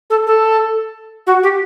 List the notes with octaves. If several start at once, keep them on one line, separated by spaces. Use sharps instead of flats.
A4
A4
F#4
G4